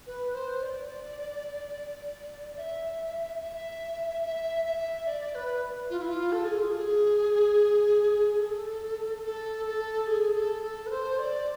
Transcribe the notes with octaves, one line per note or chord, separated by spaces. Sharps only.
B4
C5
D5
E5
E5
E5
E5
D5
B4
F4
E4
F4
A4
G#4
F4
G#4
A4
A4
A4
G#4
A4
A4
B4
C5
D5